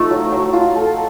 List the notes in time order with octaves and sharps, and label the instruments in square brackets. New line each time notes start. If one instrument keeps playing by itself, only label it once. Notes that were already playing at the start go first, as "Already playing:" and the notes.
Already playing: [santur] F3 D#4 [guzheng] A3
[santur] F#3
F#3
F4
A4